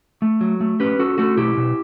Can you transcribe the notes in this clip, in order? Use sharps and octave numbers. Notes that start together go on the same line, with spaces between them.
A3
F#3
A3
C#4 G4 B4
C#4 F#4 A4
A3 F#4 A4
B2 E4 G4
B2